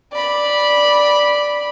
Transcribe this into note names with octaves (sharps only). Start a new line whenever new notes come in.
D5 B5